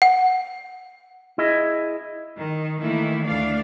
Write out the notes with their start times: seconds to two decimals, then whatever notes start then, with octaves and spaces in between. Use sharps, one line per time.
0.02 F#5
1.38 E4 G#4 D#5
2.37 D#3
2.79 D#3 E3 A3 A#3 E4
3.25 D2 A3 D4 D5 F5